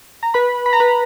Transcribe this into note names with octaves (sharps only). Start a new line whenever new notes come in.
A#5
B4 B5
B5
A#5
B4 B5